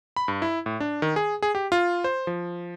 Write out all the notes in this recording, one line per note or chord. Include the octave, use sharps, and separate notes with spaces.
B5
G2
E4
A2
D4
D#3
G#4
G#4
G4
F4
C5
F3